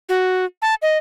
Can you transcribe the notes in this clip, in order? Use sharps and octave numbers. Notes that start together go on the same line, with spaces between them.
F#4
A5
D#5